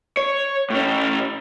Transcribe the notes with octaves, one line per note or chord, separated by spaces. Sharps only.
C#5
A2 C#4